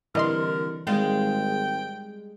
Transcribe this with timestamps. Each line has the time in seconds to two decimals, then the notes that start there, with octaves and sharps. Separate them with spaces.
0.15 C2 D3 E3 A#4 D#5 C6
0.87 G#1 G3 G#3 F4 G5